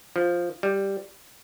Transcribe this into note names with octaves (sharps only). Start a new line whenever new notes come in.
F3
G3